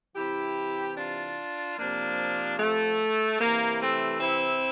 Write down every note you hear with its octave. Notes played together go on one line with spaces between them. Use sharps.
C3 E3 E4 G4
D4 F4
C3 F3 A#3 D4
A3
C3 E3 A#3
A3 C4
C4 E4